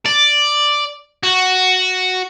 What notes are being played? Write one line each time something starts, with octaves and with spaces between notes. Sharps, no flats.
D5
F#4